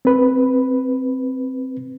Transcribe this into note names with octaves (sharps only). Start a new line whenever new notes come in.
C4 B4